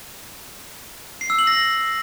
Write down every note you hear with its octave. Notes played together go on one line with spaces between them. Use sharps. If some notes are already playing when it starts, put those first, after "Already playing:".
C7
E6
F#7
A#6